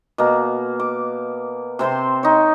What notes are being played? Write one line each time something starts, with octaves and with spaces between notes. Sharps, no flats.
B2 A#3
D6
C3 C4 C5 C6
D#4 C#5